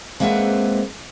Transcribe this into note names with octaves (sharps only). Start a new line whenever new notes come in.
G#3 A#3 C4 B4 E5 F#5